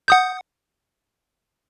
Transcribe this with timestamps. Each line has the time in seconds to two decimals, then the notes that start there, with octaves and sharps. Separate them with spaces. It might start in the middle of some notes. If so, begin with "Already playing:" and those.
0.08 F#5 D#6 G6